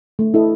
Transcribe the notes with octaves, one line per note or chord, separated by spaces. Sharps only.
A3
E4 A4 D#5